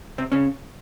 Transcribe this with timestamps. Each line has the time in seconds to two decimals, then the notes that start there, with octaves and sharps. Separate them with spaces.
0.18 C3 C4
0.32 C#3 C#4